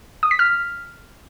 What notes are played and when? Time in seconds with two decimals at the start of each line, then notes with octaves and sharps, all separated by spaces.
0.23 D#6
0.31 B6
0.39 F6